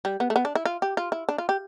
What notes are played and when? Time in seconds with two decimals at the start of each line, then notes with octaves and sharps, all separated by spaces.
0.05 G3
0.20 B3
0.30 A3
0.36 B3
0.45 D4
0.55 E4
0.65 F4
0.82 G4
0.97 F4
1.12 E4
1.29 D4
1.38 F4
1.49 G4